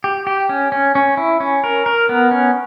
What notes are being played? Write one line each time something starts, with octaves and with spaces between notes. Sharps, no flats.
G4
G4
C#4
C#4
C#4
E4
C#4
A#4
A#4
B3
C#4